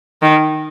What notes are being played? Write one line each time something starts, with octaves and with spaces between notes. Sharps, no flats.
D#3